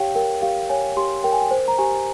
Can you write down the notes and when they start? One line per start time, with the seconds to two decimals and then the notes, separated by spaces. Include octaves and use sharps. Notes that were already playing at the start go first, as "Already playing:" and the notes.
Already playing: G4 C#5 F5 G5
0.15 A#4 G5
0.42 G4 F5
0.70 C#5 G#5
0.97 G4 C6
1.24 A#4 G5
1.33 G#5
1.41 G5
1.51 C5
1.68 A#5
1.78 G4 G#5